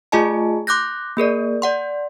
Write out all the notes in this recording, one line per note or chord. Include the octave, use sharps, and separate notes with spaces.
A3 F4 G#4 D#5 G#5 A5
C6 D6 F#6 G6 A#6
A#3 G#4 A#4 D5
D5 F#5 C6